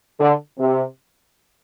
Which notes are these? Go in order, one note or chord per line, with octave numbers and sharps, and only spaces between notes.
D3
C3